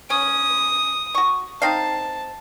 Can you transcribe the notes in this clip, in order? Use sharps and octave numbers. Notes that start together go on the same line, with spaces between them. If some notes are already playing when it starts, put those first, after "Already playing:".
C#4 D#6
F#4 C#6
C4 D#4 F5 A5